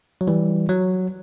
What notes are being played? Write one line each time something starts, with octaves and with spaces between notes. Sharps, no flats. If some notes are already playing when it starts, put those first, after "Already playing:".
F#3
E3 G3
F#3